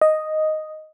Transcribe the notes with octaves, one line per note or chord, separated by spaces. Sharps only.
D#5